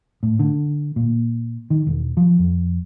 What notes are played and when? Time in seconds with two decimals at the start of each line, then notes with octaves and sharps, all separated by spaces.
0.23 A2
0.39 D3
0.96 A#2
1.70 D#3
1.86 E1
2.17 F3
2.39 F2